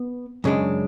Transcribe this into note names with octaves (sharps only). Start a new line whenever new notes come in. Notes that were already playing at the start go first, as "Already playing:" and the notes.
Already playing: B3
F#2 C#3 G#3 D4